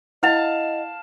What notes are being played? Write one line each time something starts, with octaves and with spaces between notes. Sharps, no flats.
E4 D#5 F5 F#5 A5 F7